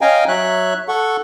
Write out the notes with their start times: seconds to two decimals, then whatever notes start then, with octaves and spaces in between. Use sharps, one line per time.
0.01 C#4 D#5 F5 G5 G#5 A#5
0.28 F#3 C#5 E5 F#6
0.88 A4 F#5 C#6